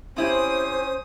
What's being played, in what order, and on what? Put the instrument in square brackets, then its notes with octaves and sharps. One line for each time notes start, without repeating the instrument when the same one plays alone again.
[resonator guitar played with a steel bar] C4 E4 G4 [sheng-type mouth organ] C#4 G#5 [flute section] C5 [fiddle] D#6